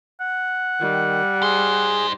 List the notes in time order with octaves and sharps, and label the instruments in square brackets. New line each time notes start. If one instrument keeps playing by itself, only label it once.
[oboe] F#5
[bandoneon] D#3 [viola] G3
[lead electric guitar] D#4 C5 [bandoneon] G#4